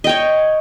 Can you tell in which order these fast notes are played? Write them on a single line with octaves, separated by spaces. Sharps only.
D#5 G5 C#5